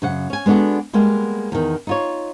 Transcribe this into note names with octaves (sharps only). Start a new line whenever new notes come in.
F#2 C#3 F#5
C#4 G#5
G#3 B3 D4 F#4 A4
G3 G#3 A#3 B3
E2 D#3
D#4 F4 C#5